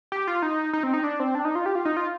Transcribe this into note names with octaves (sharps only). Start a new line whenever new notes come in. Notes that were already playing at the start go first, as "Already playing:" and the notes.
G4
F4
D#4
D#4
C4
D#4
D4
C4
D4
D#4
F4
G4
F4
D#4
F4